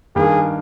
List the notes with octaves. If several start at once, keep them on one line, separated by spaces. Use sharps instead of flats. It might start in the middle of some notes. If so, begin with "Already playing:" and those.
G2 D#3 A#3 G#4